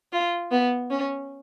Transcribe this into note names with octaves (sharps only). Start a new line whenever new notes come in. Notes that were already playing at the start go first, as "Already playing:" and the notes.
F4
B3
C#4